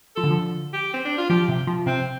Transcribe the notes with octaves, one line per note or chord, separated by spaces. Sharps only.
F3 A4
D3
F3
G4
C4
D4
F4
F3 G4
C3
F3
C3 C4